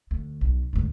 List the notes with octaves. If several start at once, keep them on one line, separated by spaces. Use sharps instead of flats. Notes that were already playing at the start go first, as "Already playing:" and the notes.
D2
B1
D2 G#2